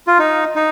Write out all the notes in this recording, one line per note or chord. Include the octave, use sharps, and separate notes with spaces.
F4
D#4
D#4